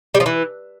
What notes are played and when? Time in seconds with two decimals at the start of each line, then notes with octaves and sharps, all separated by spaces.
0.14 G3
0.20 F3
0.26 E3